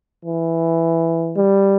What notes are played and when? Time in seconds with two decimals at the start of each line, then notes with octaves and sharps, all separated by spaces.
0.24 E3
1.36 G3